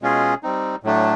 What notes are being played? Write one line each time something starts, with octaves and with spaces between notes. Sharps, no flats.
B2 G#3 C#4 F4 G#4
G3 C4 D#4
A2 F#3 A3 D4